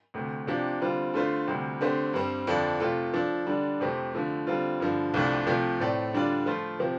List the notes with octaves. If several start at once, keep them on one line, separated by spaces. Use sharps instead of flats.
D2 C3 A3
C3 F3 D4 G4
D3 G3 C4 F4
D3 A3 F4 C5
D2 C3 G3
D3 A3 C4 G4 C5
G2 G3 C4
F2 D3 F3 D4 A4
C3 A3 F4 A4
F3 D4 A4
D3 G3 D4
F2 C3 A3 C4 G4
D3 F3 A3
D3 G3 C4 F4
G2 D3 F3
C2 C3 F3 A3 D4
C3 F3 A3
A2 A3 C4 A4 D5
D3 G3 D4 F4 D5
F3 A3 F4 C5
C3 F3 C4 G4